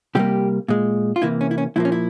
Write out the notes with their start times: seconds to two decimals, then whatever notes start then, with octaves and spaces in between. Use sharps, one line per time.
0.15 C3 G3 A#3 G4
0.68 A#2 G#3
1.16 F4
1.22 C3 E3 A#3 E4
1.41 C#4
1.51 E4
1.58 C#4
1.76 A#2 F3 A#3 E4
1.85 C#4
1.92 E4